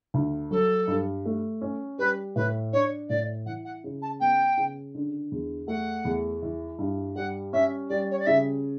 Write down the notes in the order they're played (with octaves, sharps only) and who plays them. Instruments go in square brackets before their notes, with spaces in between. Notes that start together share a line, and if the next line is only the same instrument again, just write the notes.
[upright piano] D2
[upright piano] F#3 [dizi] A4
[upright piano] G2
A3
C#4
[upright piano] G3 [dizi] B4
[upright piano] A2 [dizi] B4
[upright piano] D4 [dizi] C#5
[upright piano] A2 [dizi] D5
[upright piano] E3 [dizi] F#5
[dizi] F#5
[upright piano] C#3
[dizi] A5
[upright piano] B3 [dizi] G5
[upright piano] C#3
D3
E2
[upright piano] A3 [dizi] F#5
[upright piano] E2
E3
G2
[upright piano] G3 [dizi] F#5
[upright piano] C#4 [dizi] E5
[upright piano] G3 [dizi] D5
[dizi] C#5
D5
[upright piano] C#3 [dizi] E5